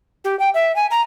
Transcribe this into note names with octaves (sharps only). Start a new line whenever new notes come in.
G4
G5
E5
G#5
A#5